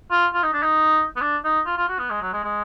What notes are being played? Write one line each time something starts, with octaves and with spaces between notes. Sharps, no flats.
F4
F4
D#4
D4
D#4
B3
D4
D#4
F4
F4
F#4
B3
G#3
F#3
G#3
G#3